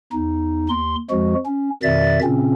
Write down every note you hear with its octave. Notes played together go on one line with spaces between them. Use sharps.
E2 D#4
D#2 C6
F2 F3 G#3 F#4
C#4
F2 B2 D#3 D5 E5 A6
A#2 C#3 C4 C#4